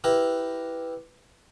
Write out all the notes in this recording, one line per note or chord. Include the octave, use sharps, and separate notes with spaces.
E4 G4 A#4 B4